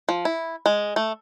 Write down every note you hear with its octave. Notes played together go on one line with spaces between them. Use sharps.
F3
E4
G#3
A3